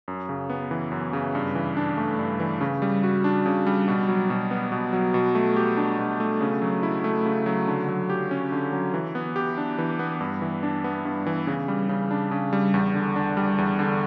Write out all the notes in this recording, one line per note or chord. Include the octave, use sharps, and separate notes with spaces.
F#2
C#3
B3
E3
F#2
C#3
G2
E3
D4
A3
G2
E3
C#3
G3
F#4
D4
C#3
G3
B2
F#3
B2
B3
B2
F#3
B2
A3
G4
D4
B2
A3
C#3
F#3
E4
A3
C#3
F#3
D3
F#3
G4
C#4
D3
F#3
E3
B3
G4
D4
E3
B3
G2
E3
D4
B3
G2
E3
C#3
G3
C#3
D4
C#3
G3
E2
D3
D4
G3
E2
D3